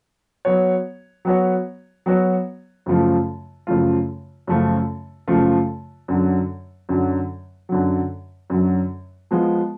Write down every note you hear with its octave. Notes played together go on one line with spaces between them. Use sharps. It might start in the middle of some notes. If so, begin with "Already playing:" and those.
F#3 B3 F#4 C#5
F#3 B3 F#4 C#5
F#3 B3 F#4 C#5
F#2 C#3 F3 A3 F4
F#2 C#3 F3 A3 F4
F#2 C#3 F3 A3 F4
F#2 C#3 F3 A3 F4
F#2 D3 F#3
F#2 D3 F#3
F#2 D3 F#3
F#2 D3 F#3
F3 G#3 B3 F4